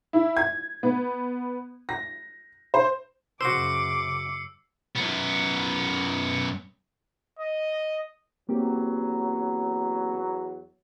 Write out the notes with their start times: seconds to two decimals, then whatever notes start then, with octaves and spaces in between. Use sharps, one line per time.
0.13 E4
0.37 G#6
0.83 B3
1.89 A#6
2.74 C5
3.41 F#2 C#3 F#4 C5 D6 E6 C7 C#7
4.96 F#2 B3
7.39 D#5
8.49 E2 F#3 A#3 C4 G4